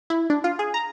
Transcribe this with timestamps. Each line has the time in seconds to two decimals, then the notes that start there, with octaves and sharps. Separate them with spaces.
0.10 E4
0.30 D4
0.44 F4
0.59 G#4
0.74 A#5